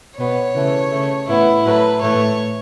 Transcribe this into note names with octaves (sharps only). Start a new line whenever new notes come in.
B2 B3 C#5
C#3 E3 A3
C#3 A3
A2 E3 B3 E4
A2 F#3 A3 B4
A2 E3 A3 C#5